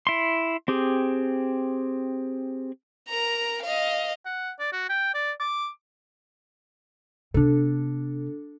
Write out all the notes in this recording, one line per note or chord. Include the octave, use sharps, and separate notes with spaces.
E4 C6
C4 G4 G#4
A#4 A#5
D#5 F5
F#5
D5
F#4
G5
D5
D6
C3 B3 D4 A4